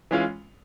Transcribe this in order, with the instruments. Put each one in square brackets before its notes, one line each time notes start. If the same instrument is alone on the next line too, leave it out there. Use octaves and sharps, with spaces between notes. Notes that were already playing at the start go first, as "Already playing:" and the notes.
[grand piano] E3 G#3 C#4 F4